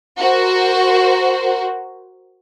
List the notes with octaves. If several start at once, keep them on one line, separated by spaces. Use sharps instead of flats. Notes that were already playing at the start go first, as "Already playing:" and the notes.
F#4 A#4 C5